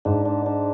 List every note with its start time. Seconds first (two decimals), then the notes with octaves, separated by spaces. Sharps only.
0.05 G#2 D4
0.26 D4
0.46 D4